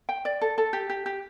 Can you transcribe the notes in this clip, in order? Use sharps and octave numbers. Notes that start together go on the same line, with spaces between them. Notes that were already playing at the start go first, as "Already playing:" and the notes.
G5
D5
A4
A4
G4
G4
G4